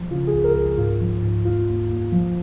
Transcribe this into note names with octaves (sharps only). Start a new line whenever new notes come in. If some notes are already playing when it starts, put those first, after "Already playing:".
Already playing: F3
C#3 F4
G#4
C#2
A#4
C#2
G#4
G#2 F4
F3
G#2
D#2 F4
D#2
D#2
F3